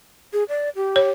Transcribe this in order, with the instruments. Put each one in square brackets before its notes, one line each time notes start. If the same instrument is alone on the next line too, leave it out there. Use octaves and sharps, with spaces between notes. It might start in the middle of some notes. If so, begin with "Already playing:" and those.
[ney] G#4
D5
G4
[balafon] C#5